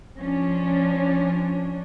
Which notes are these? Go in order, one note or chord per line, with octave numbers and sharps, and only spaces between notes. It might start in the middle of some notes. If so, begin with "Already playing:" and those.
F3 C#4 D4